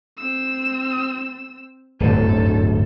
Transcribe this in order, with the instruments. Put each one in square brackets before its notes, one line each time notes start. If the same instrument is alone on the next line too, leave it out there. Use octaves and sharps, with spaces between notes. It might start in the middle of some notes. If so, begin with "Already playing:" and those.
[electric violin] C4 E6
[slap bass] D1 G1 F#2 [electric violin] A4